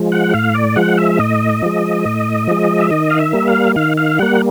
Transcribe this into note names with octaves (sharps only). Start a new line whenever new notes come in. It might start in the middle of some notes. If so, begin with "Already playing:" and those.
Already playing: F3 G#3
F#5
A2 F5
D5
F3 G#3 F#5
E5
A2 D#5
F3 G#3
A2
F3 G#3
E5
D#3 D#5
F5
E5
G3 A#3
F5
D#3 F5
F5
G3 A#3 F#5